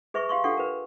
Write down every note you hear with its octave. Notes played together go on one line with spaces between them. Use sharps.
G#4 B4 E5 C#6
G4 F5 C6 C#6
D4 F4 A4 F#5 G5 C#6
A#4 B4